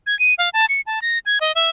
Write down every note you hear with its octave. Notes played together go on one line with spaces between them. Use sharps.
G#6
D#7
F5
A5
C#7
A5
A#6
G#6
D#5
E5